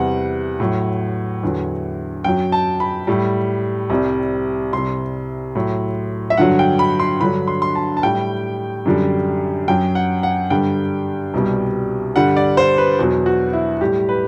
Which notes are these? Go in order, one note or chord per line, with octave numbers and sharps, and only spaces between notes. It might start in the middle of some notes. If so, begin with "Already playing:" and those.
Already playing: E2 C3 G3 F#5
A2 F#3
E2 D3 F#3
F#2 F#3 G5
A5
B5
A2 G3
C2 C3 G3
C2 C3 G3 C6
A2 F#3
E5
G2 D3 F#3 F#5
G5
B5
C6
G2 D3 F#3 B5
C6
C6
A5
A5
A2 G3 G5
F#2 D3 G3
F#2 F#3 G5
F#5
F#5
G2 D3 G3 G5
C2 B2 G3
G2 D3 G3 F#5
D5
C5
B4
E2 B2 F#3
F#4
E4
A2 G3 G4
B4